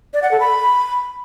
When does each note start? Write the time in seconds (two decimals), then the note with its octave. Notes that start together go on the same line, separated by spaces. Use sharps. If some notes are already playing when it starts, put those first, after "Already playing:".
0.14 D5
0.22 F#5
0.31 A4
0.40 B5